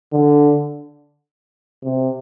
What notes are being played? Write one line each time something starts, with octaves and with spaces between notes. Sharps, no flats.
D3
C3